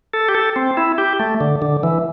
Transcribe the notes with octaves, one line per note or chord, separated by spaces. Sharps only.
A4
G4
A4
C4
E4
G4
A3
D3
D3
E3